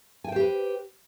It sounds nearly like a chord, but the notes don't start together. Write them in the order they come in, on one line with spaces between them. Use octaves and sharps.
G#5 G5 C5 G4 B4